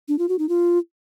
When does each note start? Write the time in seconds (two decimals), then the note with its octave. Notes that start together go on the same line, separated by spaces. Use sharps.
0.08 D4
0.19 F4
0.29 F#4
0.39 D#4
0.49 F4